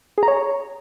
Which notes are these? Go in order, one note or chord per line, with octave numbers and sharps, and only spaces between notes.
G#4
A#5
C#5